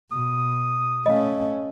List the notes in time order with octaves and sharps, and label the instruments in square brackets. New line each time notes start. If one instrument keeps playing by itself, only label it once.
[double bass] B2 [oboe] D#6
[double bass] A3 C#4 [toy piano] D#5 F5